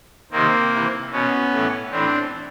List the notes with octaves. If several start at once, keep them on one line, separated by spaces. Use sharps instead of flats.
C3 D#3 A#3 C4
C3 E3
B2 B3 C#4
A2 E3
A2 E3 C4 D4